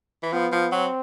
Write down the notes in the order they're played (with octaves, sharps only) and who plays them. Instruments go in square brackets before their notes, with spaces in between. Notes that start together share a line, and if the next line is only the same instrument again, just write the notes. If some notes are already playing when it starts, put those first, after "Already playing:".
[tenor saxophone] E3
[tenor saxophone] F3 [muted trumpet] B3
[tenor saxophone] F3
[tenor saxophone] F#3 [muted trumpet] C4